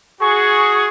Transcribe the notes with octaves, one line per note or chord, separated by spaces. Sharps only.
F#4 G#4 C#6